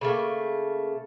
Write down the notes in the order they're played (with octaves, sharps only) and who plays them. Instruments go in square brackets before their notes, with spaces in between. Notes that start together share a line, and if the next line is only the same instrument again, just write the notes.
[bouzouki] C#3 A3 A#3